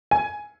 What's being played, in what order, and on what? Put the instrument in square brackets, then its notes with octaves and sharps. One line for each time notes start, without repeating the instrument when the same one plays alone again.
[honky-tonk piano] G#5